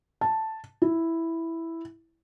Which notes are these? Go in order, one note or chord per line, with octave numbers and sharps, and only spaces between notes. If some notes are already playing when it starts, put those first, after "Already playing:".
A5
E4